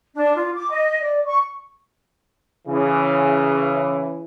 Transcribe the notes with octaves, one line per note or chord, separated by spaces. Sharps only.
D4
F4
D6
D#5
D5
C#6
C#3 E3